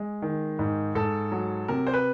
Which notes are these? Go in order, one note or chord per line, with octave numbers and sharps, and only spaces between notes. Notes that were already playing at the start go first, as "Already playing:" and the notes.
Already playing: G#3
D#3
G#2
G#2 A4
F#3
C3 A#4
C5
B4